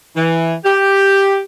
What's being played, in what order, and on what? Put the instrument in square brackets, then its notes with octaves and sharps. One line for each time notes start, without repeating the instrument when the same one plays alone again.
[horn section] E3
G4